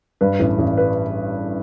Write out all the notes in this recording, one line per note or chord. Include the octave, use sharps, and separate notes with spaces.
G2 B4
A1
A1
B4